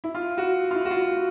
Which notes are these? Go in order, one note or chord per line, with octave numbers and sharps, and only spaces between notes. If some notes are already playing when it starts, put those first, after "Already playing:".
E4
F4
F#4
F4
E4
F#4
F4